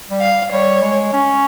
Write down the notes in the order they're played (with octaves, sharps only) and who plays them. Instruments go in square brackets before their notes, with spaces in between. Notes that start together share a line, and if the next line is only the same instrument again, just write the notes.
[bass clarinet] G3
[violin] F5
[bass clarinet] G3 [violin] C#5
[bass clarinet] G#3
C#4